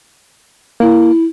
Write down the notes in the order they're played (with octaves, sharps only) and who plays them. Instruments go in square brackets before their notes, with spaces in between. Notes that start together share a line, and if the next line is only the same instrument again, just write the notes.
[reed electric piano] A#3 [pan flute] E4